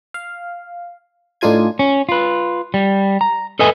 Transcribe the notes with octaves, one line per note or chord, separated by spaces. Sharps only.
F5
A2 D4 D#4 F4 G#5 G#6
C#4
F4 B4
G3
A#5
A4 B4 D#5 E5 G#5